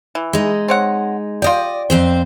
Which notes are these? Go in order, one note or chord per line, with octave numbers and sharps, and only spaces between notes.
E3
G#3 D#4
C4 C#5 F#5
F4 G4 D5 D#5 G5
F2 C4 C5